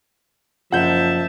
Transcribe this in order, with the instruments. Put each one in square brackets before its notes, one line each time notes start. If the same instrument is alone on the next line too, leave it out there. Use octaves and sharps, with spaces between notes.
[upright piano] F#1 [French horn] F3 [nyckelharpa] E5 A5 [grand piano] F#5 G6